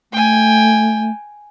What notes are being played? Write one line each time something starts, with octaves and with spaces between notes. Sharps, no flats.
A3 G5 G#5